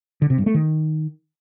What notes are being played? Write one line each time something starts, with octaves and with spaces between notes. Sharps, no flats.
D3
C3
G2
A3
D#3